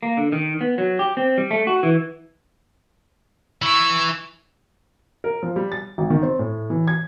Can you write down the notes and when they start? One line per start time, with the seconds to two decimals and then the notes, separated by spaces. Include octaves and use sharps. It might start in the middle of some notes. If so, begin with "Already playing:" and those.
0.03 A#3
0.17 D3
0.32 D#3
0.61 B3
0.78 F#3
0.99 G4
1.17 C4
1.38 G3
1.51 A3
1.67 F#4
1.83 E3
3.62 E3 C#6 E6
5.24 A#4
5.43 F3
5.56 G3
5.72 A6
5.98 G#1
6.10 D#3
6.23 C4
6.39 A2
6.70 E3
6.88 G#6